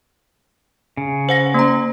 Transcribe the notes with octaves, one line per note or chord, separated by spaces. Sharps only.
C#3
C5 F#5 A#6
A#3 A#5